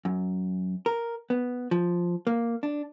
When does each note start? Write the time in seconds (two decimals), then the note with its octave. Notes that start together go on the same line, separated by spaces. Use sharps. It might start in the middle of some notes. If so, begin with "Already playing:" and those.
0.05 F#2
0.86 A#4
1.30 B3
1.71 F3
2.27 A#3
2.63 D4